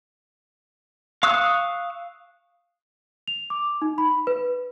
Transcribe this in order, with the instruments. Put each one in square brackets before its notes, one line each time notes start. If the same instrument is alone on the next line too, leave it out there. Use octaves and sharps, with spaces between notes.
[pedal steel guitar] F5 C#6 D#6 E6 F#6
[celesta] F7
D6
D#4
B5
B4